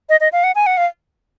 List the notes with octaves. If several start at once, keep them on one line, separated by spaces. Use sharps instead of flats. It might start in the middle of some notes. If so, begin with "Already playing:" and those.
D#5
D#5
F5
F#5
G#5
F#5
F5